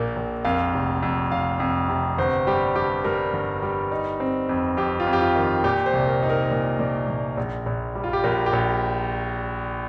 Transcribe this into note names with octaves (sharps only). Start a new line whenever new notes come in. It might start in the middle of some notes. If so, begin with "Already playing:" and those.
Already playing: A#1 A#2 A#3
A#1
F2 F5
F1
F2
F1 F5
F2
C3
G1 C5
G3 G4
G2 G4
G3 A#4
G1
G3
D#4
C4
F2
F2 G4
F4
F2
G4
F4
D#3
F4
A#2 G4
C5
C2
A#4
D#4
A#4
A#2
A#2
A#2
A#1
A#1
G3
F4
G4
A#1 A#4
G4
A#1